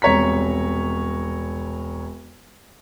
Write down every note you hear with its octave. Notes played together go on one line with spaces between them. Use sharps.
E1 C2 C#5 A#5 B6